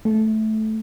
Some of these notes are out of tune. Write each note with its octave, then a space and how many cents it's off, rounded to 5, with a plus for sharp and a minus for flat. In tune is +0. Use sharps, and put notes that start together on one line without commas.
A3 -15